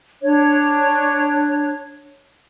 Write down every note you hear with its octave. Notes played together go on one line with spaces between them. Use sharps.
D4 C#5